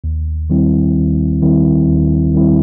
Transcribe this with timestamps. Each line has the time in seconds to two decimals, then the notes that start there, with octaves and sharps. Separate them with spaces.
0.04 D#2
0.50 D#3 G3 C4 E4
0.96 D#2
1.42 D#3 G3 C4 E4
1.87 D#2
2.34 D#3 G3 C4 E4